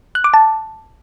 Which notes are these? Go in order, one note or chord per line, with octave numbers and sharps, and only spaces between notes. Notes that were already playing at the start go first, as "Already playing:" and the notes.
F#6
D6
A5